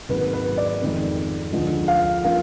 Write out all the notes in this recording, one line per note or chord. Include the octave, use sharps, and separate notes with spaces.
G#1 G#2 F#3 A#3 B4
B4
D5
F2 D#3 G#3
D2 D3 F3 G#3
F5
F3 A#3 F5